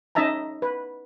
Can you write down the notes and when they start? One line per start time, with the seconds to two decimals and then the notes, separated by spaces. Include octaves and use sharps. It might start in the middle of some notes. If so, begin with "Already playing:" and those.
0.15 C#4 D#4 D#5 E5 A5 A#5
0.62 B4